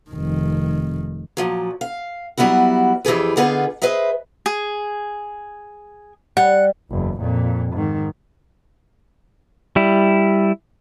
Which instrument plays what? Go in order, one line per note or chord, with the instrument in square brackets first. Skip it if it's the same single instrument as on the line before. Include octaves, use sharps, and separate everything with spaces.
[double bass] F1 D#3
[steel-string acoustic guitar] A#2 F3 F#3
F5
F#3 G3 B3 E4 F#4
F2 E3 G4 G#4 B4
D3 B3 D#4 F4 G#4 B4
G#4 B4 C5 D#5 E5
[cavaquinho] G#4
[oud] G3 [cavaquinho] F#5
[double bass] F#1 E2
F2 A#2
G#2 D#3
[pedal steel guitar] G3 E4